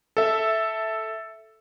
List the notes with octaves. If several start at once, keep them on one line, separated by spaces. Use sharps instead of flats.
A4 E5